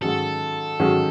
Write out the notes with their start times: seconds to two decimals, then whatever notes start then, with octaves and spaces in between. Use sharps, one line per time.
0.02 G#2 D#3 F#3 C#4 G#4 A4
0.80 G#2 D#3 F#3 C#4 G#4